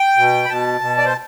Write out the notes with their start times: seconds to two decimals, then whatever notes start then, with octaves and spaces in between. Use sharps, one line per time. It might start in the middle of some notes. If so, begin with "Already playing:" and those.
Already playing: G5
0.17 B2
0.45 B5
0.49 B2 A5
0.81 B2
0.97 D5
1.05 C5